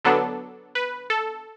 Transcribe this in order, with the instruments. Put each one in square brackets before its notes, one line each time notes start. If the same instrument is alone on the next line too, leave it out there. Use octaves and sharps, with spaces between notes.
[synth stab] D3 F#3 B3 D4 A4
B4
A4